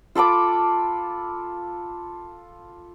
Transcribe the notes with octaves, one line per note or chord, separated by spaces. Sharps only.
F4 A4 B5 D6